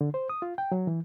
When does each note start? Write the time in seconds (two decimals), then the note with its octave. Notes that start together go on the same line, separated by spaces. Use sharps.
0.01 D3
0.14 C5
0.29 D#6
0.42 F4
0.58 G5
0.72 F#3
0.87 E3